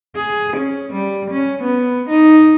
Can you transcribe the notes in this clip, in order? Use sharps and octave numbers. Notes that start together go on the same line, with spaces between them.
G#4
C#4
G3
C#4
B3
D#4